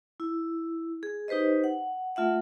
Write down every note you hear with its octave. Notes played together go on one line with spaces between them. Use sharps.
E4
G#4
D#4 G4 B4 C5 D#5
F#5
A3 F4 E5 F#5